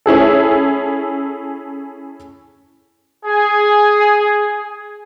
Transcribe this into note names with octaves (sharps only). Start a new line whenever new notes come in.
C#4 E4 G#4 A4
G#4 G#5